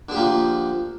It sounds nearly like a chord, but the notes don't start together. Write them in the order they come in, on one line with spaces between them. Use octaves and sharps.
D3 G#4 G4 A#3 F3